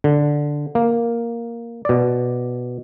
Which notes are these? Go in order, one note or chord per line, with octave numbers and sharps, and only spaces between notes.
D3
A#3
B2 D5